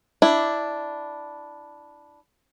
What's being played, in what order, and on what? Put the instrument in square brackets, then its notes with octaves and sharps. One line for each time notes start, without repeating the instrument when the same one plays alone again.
[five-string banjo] D4 E4